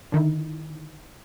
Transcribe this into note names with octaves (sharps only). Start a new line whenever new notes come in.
D3 D#3 D#4 E4